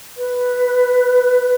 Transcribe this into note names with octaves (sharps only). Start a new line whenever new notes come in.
B4